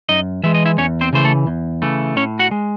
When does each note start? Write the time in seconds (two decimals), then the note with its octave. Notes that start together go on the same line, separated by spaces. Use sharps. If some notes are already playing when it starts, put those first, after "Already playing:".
0.09 F#2 D#4 D#5
0.43 E3 G#3 E5
0.54 D#5
0.65 E4 E5
0.78 E2 C#4 C#5
1.01 C4 C5
1.13 C#3 E3 A3 C5
1.24 A3 A4
1.47 E2
1.82 C#3 E3 A3
2.16 A2 C#4 C#5
2.39 F#4 F#5
2.51 G#3